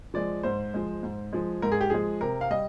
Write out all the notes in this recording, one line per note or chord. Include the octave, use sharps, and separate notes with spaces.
F3 G#3 D5
G#2 C5
F3 G#3
G#2
F3 G#3
G#2 A#4
G#4
G4
F3 G#3 G#4
C3 A#4
F5
G3 D#5